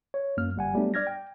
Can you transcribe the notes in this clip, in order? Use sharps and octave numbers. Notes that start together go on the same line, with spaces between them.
C#5
F#2 A#3 F6
G1 G3 F#5 G#5
F#3 G3 A3 B3 D4
D5 F6 G#6 A#6
G5